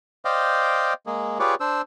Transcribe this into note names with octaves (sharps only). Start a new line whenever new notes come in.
C5 D5 D#5 F5 G5
G#3 A#3 G#4
F4 G4 G#4 B4 C#5 D5
D4 C5 E6